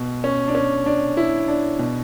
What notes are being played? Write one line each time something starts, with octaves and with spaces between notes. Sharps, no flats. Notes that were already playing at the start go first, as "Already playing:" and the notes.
Already playing: B2
C#4
D4
C#4
D4
E4
D4
B2